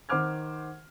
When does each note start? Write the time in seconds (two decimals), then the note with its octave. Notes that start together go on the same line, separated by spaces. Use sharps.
0.09 D#3 C5 F#5 D6 F6 G#6